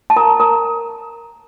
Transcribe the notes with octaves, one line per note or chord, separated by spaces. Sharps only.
A5
A#4 A#5
A#4 A#5